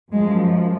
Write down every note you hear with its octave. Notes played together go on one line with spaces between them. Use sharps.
F#2 F3 G#3